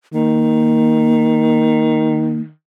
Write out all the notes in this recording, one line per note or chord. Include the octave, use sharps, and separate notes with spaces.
D#3 A#3